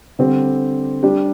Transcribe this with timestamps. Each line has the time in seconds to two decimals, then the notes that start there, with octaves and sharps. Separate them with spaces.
0.19 D3 G3 C4 G4
1.03 G3 D4 G4